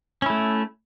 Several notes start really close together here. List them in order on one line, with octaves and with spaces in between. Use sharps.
C#4 E4 A3